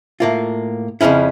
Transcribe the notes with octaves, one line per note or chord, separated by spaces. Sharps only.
A2 A#3 F4
F2 A2 C#3 C#4 E4